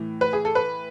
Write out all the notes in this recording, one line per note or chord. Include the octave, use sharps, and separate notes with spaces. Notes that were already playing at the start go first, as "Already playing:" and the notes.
Already playing: A2 E3
B4
G#4
A4
B4